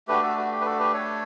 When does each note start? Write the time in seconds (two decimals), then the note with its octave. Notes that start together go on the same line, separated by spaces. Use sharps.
0.08 A3 D4 F#4 G4 B4
0.22 F#4 A4
0.37 F#4
0.51 G4
0.61 B4
0.65 F#4 A4
0.79 G4 B4
0.94 A4 C#5